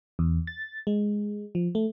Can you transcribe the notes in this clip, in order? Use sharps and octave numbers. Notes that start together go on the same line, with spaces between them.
E2
A6
G#3
F3
A3